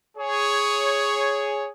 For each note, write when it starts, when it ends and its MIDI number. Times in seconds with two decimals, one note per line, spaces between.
0.18 1.70 68
0.18 1.70 73